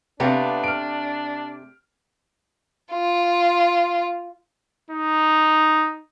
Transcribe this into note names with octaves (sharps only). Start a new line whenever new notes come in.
C3 A3 B3 D4 G4 F5
F6 D7
F4
D#4